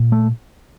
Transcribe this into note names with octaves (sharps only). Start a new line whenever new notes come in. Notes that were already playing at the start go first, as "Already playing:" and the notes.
Already playing: A#2
A3